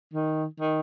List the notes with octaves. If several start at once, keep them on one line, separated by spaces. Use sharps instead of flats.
D#3
D#3